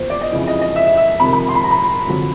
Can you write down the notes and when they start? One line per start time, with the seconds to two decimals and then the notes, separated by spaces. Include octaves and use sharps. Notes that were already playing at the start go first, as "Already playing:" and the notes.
Already playing: E2 C#3 F3 A#3 C5
0.10 D5
0.21 D#5
0.32 F2 C#3 E3
0.47 D#5
0.61 D#5
0.76 E5
0.87 E5
0.97 E5
1.19 F2 C3 D#3 B5
1.33 B5
1.48 C6
1.55 B5
1.64 A#5
1.71 B5
2.06 F2 D3 F#3